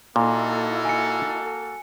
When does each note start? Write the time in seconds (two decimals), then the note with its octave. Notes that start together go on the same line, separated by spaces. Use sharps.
0.16 A#2 A#3 D#4 E4 F#4 A4 D#5
0.85 G#5 C#7